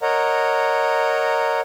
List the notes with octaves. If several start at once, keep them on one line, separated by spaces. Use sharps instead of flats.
A#4 C#5 D#5 F#5 A#5